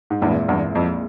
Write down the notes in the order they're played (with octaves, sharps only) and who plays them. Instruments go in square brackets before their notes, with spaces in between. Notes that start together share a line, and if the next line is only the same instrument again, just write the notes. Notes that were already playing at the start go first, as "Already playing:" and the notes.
[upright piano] G#2
[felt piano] A#1 A#2 G#3 C4 E4 [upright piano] E2 G2
[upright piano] E2 G2
F2